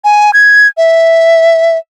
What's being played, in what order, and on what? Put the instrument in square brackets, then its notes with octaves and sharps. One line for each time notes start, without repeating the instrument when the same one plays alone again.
[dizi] G#5
G#6
E5